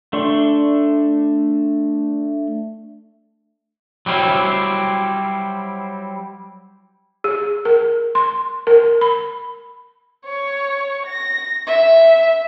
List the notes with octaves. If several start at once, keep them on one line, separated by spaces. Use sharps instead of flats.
A3 D4 D5 C6 C#6
F#3 G3 C4 E4
G#4
A#4
C6
A#4
B5
C#5
A#6
E5